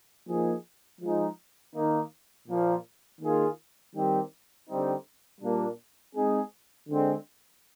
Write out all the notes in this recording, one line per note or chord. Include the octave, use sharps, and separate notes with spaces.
F3 A#3 D#4 G#4
F3 G#3 D#4
D#3 A#3 D#4
A#2 F3 A#3
D#3 A#3 F4 G#4
D#3 G3 C4 D#4 G4
D3 G3 C4 D#4
A#2 G3 A#3 D4
G#3 C4 D#4 G#4
D3 G#3 C4